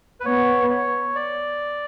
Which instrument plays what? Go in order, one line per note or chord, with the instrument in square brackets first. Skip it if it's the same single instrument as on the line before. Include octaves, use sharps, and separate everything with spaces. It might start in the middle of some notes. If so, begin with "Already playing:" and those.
[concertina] B4
[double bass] B3 [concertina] C#5
[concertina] C#5
D5